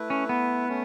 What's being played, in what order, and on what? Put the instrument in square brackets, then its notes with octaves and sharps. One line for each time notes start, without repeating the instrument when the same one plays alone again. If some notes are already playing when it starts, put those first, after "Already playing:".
Already playing: [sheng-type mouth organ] A3 E4 B4
[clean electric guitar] C#4
B3
[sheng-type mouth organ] A3 C#4